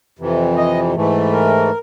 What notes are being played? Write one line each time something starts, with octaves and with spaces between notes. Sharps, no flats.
F2 C3 E3
D#5
G#2 E3 A3
A#4